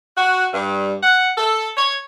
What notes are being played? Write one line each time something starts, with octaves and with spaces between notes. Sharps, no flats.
F#4
G2
F#5
A4
C#5